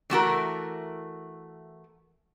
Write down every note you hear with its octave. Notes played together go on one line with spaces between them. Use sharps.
E3 A3 F#4 A#4